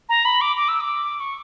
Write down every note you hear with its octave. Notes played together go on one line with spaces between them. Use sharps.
A#5
B5
D6
D6
E6
D6
C#6